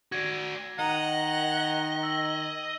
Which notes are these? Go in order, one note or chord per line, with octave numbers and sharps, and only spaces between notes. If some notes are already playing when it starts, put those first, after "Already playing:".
F#4 D5 G#6 A#6 D#7
D#3 D#5 F#5 A#5
G7
E6 A#6 F#7